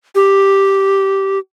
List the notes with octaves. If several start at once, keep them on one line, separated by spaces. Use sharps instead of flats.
G4